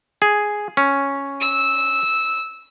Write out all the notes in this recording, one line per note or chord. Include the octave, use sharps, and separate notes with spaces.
G#4
C#4
E6